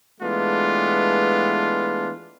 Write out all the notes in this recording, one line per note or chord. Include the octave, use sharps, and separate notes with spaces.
E3 G#3 A3 B3 D4 F4